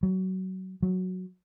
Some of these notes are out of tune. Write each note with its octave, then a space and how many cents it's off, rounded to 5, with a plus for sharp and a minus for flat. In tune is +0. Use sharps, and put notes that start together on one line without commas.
F#3 +20
F#3 -5